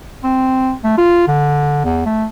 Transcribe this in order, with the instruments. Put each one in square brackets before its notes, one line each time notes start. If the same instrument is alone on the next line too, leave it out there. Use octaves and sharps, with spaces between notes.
[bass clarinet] C4
A3
F4
D3
E2
A3